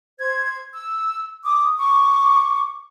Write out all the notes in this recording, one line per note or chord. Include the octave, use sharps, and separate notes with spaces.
C5 G#6
E6
D6 D#6
C#6 D6